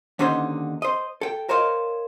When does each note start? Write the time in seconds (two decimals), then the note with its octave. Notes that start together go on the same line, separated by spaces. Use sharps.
0.19 D#2 D3 C#4 D#4 C5 F#5
0.82 C5 D#5
1.21 A4 G5
1.49 A#4 C5 C#5 D#5 F5